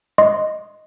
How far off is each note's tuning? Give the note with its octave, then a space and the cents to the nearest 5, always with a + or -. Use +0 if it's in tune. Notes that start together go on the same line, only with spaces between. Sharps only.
D#5 +0 C6 +0